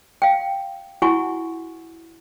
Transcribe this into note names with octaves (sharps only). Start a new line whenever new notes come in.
F5 G5
E4 F#4 F#5 G#5 C#6